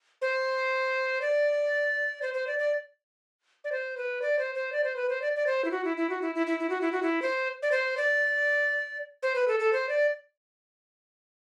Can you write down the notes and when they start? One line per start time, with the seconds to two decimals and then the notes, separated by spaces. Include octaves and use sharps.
0.22 C5
1.22 D5
2.22 C5
2.34 C5
2.47 D5
2.59 D5
3.64 D5
3.72 C5
3.97 B4
4.22 D5
4.39 C5
4.55 C5
4.72 D5
4.84 C5
4.96 B4
5.09 C5
5.22 D5
5.36 D5
5.47 C5
5.65 E4
5.71 F#4
5.85 E4
5.97 E4
6.10 F#4
6.22 E4
6.35 E4
6.47 E4
6.60 E4
6.70 F#4
6.81 E4
6.92 F#4
7.03 E4
7.22 C5
7.62 D5
7.72 C5
7.97 D5
9.23 C5
9.35 B4
9.48 A4
9.60 A4
9.73 C5
9.89 D5